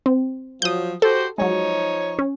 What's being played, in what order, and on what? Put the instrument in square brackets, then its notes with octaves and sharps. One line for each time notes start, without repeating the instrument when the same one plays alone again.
[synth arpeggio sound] C4
[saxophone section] F3 F#3 [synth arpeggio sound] D#6 G6
[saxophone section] F#4 G4 C5 [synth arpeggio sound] A4
[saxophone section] F3 D#4 C#5 [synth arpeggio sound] F#3 G#3
[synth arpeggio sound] C#4